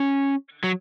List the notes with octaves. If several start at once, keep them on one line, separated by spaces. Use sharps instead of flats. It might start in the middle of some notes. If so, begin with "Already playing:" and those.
Already playing: C#4
F#3